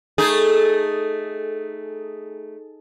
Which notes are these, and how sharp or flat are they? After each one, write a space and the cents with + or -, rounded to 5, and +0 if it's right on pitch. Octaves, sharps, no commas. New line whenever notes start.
A3 -5 D#4 +0 G#4 +0